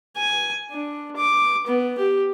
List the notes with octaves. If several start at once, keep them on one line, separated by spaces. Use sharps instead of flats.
G#5
D4
D6
B3
G4